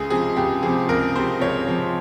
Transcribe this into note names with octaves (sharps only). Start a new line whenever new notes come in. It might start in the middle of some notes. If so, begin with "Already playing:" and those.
Already playing: C#2 G#4
C3 F3 G#4
C#2 G4
C3 F3 G#4
C#2 A#4
C3 F3 C5
C#2 C#5
C3 F3